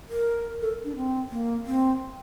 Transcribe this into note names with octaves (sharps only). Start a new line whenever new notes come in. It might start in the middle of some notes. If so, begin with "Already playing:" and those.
A#4
A4
D4
C4
A#3
C4